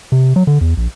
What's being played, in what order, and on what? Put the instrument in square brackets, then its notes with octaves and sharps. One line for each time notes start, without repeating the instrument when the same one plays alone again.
[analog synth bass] C3
F#3
D3
E2
A#1